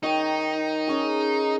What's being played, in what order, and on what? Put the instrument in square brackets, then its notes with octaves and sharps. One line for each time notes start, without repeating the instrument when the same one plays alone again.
[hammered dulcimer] D#3 C#5 G5 [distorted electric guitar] D#4
[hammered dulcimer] C#4 G#4